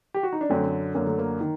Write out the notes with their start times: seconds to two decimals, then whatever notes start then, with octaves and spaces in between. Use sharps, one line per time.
0.14 G4
0.23 F#4
0.33 D#4
0.41 D4
0.50 F#2 D3 A3 C4
0.94 F#2 D3 A#3
1.07 A3
1.18 A#3
1.41 D#3